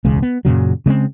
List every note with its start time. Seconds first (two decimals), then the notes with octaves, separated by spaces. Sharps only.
0.05 E1 C#2 C#3
0.22 B3
0.45 F#2 A#2 C#3 F#3
0.86 C#3 G#3 A#3 C4